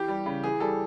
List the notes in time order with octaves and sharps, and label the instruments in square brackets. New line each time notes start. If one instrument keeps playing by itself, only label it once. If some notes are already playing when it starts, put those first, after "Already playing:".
Already playing: [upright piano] E3 G4
G3
C#3
E3 G#4
G3 A4